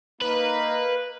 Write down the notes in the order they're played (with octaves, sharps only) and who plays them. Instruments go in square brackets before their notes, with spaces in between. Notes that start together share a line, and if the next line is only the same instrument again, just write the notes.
[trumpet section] A#3 D#4 [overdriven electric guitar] B4